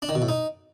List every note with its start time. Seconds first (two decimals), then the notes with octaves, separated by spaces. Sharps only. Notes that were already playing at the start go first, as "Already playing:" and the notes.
0.02 D4
0.09 D#3
0.15 B2
0.22 A2
0.28 D#4